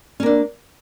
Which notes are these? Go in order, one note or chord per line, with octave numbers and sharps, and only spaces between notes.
A#3 C#4 D4